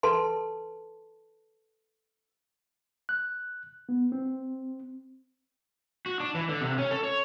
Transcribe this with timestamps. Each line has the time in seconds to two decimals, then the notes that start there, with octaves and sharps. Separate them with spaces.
0.03 A4 B4 A5 C6
3.09 F#6
3.89 B3
4.12 C4
6.06 F#4
6.20 D4
6.35 E3
6.49 D3
6.61 C3
6.78 C#4
6.91 A4
7.03 C#5